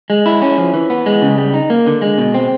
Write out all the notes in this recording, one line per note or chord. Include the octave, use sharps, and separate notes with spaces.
G#3
E4
C#4
F3
E3
B3
G#3
C#3
G3
D#4
A#3
D3
G#3
B2
C4